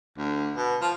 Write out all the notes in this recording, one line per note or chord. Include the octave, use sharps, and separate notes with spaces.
D2
B2
F3